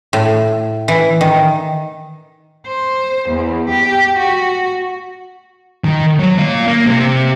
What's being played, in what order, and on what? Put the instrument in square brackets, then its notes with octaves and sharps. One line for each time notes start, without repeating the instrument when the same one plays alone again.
[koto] A2
E3
D#3
[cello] C5
E2
G4
F#4
[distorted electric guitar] D#3
F#3 C#5
A#2 F5
A#3
C3 C4